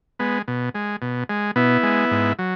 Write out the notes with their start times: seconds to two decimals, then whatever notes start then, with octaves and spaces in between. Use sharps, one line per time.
0.19 G#3 B3
0.48 B2
0.75 G#3
1.02 B2
1.29 G#3
1.56 B2 B3 E4
1.83 G#3
2.11 G#2
2.39 F#3